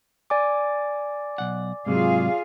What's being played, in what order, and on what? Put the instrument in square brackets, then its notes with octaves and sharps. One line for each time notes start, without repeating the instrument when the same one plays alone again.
[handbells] D5 G#5 D6
[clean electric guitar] B1 F#5
[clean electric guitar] G#2 C3 F#3 [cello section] F4 G#4 F5